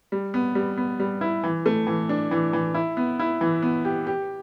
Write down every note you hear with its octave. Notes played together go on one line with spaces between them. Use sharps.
G3
B3
G3
B3
G3
E4
E3
A3
E3
D4
E3
E3
E4
B3
E4
E3
B3
G4
G4